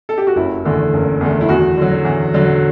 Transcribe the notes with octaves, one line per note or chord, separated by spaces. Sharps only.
A4
G4
F#4
F#1 E4
E2 D3 A3
F#1
E2 D3 A3
E4
E2 F#4
D3 F#3
E2
D3 F#3